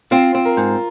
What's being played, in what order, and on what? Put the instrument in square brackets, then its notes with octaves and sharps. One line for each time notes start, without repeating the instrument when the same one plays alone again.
[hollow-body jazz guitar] C4 [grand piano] F4
[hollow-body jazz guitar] C4
[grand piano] A#4
[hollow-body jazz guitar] G#2